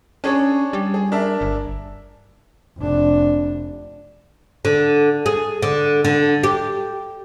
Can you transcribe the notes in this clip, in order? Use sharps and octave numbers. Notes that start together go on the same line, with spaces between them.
C#4 D4 G#4 C#5
G3
G#4
D4 A#4 E5
G1
F1 D4
D3
G#4
D3
D3
G4